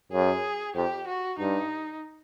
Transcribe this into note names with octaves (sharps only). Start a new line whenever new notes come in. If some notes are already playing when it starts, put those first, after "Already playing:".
F#2 G#4
F2 G4
F#4
G2 D#4